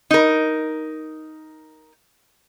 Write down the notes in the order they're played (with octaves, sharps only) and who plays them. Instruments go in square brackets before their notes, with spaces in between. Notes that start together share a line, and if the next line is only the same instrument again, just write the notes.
[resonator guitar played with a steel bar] D#4 A#4